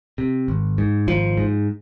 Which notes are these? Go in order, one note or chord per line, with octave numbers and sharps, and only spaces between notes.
C3
G#1
G#2
G#1 F3
G#2